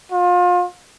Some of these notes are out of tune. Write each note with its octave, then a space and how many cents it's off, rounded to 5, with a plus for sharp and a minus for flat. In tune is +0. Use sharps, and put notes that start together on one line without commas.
F4 +30